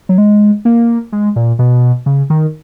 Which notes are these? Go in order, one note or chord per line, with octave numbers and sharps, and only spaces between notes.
F#3
G#3
A#3
G#3
A#2
B2
C#3
D#3